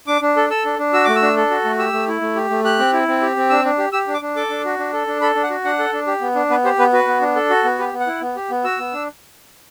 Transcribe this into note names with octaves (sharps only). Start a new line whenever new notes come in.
D4 D6
D4
A4
A4 E6
D4
D4
F#4 E6
A3 D6
E6
D4
A4
F#4
A3
G4 E6
A3
E4
A3
G4
A3
G4 F#6
C4
E4
C4
G4
C4
D4 E6
D4
G4
G4 E6
D4
D6
D4
A4 D6
D4
F#4
D4
A4
D4
A4 B5
D4
F#5
F#4
D4 F#5
A4
D4
G4
B3
D4
B3 B4
G4 C5
B3 B4
F#4 B4
B3
D4
A4
F#4
B3
G4 B4
B3
F#5
E4
B3
G4
B3
F#4 E6
B3
D4